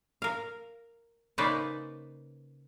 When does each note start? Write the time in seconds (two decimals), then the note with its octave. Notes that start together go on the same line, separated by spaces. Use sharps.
0.22 A#4 F5
1.38 C#3 A#3 D#4 B4 C5 D5